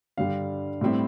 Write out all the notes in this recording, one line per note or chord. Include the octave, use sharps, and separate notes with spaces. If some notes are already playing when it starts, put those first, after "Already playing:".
G2 D3 G3 F5
A2 G3 C4 E4